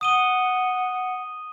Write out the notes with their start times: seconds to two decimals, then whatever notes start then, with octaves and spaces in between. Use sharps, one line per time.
0.01 F#5 D#6 D#7 G7